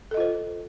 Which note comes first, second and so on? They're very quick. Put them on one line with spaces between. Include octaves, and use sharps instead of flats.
A4 D#5 F4 C5